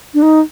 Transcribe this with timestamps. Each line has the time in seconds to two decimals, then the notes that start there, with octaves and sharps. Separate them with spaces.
0.14 D4
0.22 D#4